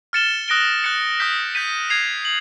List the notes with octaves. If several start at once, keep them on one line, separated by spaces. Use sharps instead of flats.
F6 A6 C#7 E7 G7
D#6 F#6 A#6 D7 G7
F#6 A6 C#7
D#6 G6 B6
G6 B6 D#7
G#6 C7 F7
F#7